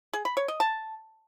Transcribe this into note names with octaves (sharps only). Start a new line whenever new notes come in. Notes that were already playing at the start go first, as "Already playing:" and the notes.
G#4
B5
C#5
D#5
A5